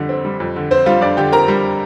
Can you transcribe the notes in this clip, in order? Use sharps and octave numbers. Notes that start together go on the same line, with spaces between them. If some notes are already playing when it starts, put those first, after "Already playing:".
Already playing: F2 D3 G3
C4
G3
F2
D3
C4 C5
G3 F4 F5
F2 D4 D5
D3 G4 G5
C4 A#4 A#5
G3